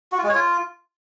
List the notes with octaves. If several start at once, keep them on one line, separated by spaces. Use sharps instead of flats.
F#4
F4
G#3
C#5
F4